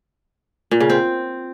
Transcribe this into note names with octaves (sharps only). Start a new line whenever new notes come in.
A#2
C#3
C4